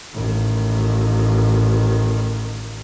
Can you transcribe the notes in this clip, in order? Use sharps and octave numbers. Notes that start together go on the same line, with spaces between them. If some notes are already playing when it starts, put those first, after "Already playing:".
A1 D#3